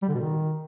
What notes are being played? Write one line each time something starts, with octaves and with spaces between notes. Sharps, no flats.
G3
D3
B2
D#3